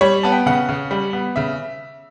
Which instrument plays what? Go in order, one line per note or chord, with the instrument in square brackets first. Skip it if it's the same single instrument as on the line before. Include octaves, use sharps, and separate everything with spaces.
[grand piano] G3 C#5
B3 A5
G5
C#3 F#5
C#3
G3
B3
C#3 E5